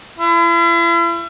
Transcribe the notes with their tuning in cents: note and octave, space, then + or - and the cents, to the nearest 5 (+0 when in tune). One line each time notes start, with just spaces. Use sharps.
E4 +40